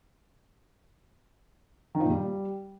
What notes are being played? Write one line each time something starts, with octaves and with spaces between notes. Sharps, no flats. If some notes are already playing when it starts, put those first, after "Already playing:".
D#3
F3
A#2
G3